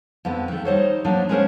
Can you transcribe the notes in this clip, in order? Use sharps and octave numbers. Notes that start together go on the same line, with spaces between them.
F2 D3 B3 B4
D#3 A3
G3 D#4 C5 C#5
F3 F#3 A#3 D4 D#4
G#3 B3 C#4 A#4 C5 C#5